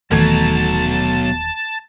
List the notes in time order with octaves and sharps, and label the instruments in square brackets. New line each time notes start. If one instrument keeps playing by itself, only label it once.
[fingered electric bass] D#1 D#3 E3 [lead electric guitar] B2 F#3 [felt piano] A3 G#6 [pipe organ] A5